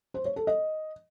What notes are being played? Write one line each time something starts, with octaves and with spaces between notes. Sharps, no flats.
C5
C#5
A4
D#5